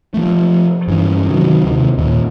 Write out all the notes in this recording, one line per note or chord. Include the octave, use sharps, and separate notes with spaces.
F3 A3
G2 E3 C#4
C3 D#3 F#3
D#2 C3
D#2 A#2